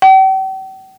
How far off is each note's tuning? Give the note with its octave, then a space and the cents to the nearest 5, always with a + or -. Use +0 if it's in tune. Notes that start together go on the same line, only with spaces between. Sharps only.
G5 -45